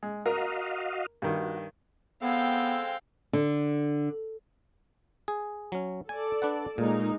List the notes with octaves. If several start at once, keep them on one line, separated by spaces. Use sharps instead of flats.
G#3
F#4 A#4 D#5 F5
G2 D#3 F#4
G#3 B3 C4 A4 F5 G5
D3
G#4
F#3 C#4
A4 D5 G#5
D4 B4 F#5
A#2 G#3 A#3 D#4